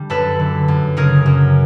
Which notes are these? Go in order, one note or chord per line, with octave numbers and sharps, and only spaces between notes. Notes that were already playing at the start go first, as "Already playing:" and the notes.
Already playing: D3 G3
F#2 A4 B4
D3
F#2
C#3 G#4 A#4
F#2